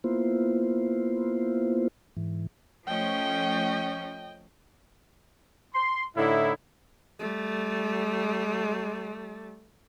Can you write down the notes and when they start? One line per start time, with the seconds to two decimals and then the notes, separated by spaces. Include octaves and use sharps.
0.04 A#3 B3 E4 F4 C5
2.17 G#2 E3
2.87 F3 A3 C#4 D#5 G5
5.73 C6
6.16 A2 D3 D#4 E4
7.20 G3 A3